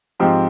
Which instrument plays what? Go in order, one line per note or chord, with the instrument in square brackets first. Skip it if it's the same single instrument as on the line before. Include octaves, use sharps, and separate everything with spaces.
[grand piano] G#2 F3 C4 G4